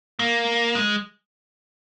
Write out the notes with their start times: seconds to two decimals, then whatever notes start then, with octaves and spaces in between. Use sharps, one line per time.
0.19 A#3
0.75 G#3